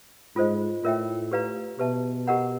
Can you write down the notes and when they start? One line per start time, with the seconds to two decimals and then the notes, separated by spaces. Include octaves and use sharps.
0.36 G#2 F4 A4 C5 D#5
0.84 A2 F4 A#4 C#5 E5 G5
1.32 G4 B4 D5 F5 A#5
1.79 B2 G4 B4 E5 A5
2.27 G4 A#4 D#5 F#5 A#5